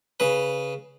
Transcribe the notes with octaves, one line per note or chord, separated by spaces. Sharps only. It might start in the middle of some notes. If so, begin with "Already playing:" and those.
C#3 B4